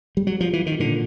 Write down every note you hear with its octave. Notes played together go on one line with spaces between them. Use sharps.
G3
F#3
F3
E3
D#3
A#2 D3